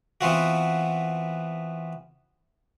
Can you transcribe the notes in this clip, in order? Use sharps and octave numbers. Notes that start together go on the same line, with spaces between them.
E3 B3 C4 F4 F#4